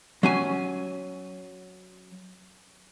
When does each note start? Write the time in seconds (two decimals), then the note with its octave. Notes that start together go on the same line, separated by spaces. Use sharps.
0.23 F#3 C#4 G#5